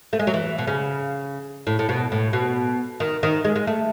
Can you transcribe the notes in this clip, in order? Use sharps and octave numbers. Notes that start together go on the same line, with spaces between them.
A3
G#3
F#3
E3
B2
C#3
A2
A2
B2
A2
B2
D#3
D#3
G#3
G#3
A3